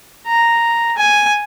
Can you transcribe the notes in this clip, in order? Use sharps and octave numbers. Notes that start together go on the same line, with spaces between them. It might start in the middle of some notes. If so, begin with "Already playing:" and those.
A#5
G#5